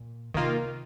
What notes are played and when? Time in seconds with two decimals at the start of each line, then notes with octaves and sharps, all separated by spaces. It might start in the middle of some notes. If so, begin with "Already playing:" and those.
Already playing: A#2
0.34 C3 D#3 A#3 F4